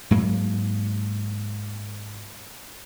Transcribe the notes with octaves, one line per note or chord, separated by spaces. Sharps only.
G#2 F#3 A#3